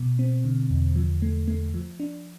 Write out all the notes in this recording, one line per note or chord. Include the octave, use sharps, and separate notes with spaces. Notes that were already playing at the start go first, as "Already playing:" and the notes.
Already playing: B2
C4
D3
E2
F3
A3
A3
F3
D4